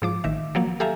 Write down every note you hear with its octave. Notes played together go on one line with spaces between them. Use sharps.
G#2 F3 D6
A1 D#3 E5
F3 F#3 A#3
G4 A4 E5 F5 G#5 A#5